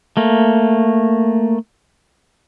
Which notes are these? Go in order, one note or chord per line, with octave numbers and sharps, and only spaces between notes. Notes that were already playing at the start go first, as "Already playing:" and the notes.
A3 A#3